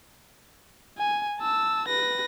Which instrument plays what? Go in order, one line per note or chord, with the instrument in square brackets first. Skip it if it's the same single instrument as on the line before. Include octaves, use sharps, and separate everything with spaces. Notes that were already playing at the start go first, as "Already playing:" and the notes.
[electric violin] G#5
A5 E6
B4 A#6